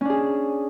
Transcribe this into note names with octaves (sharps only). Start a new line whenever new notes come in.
C#4 D4 G#4